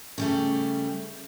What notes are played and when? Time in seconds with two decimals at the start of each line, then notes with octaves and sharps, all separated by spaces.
0.18 C#3 G3 A3